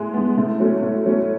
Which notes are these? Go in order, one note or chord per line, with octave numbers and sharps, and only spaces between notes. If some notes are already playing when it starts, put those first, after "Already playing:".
Already playing: A2 G#3
G#3 B3
A2
F#3 A3 C#4
A2
F#3 A3 C#4